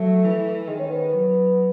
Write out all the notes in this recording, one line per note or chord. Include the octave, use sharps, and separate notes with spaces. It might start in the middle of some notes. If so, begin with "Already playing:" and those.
Already playing: F#3 A3
E3
D#3 G#3
C#4
B3
B3
F#3